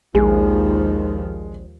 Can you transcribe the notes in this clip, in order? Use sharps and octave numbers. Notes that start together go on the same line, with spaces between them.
A#1 D#2 G#2 D#3 F3 G#3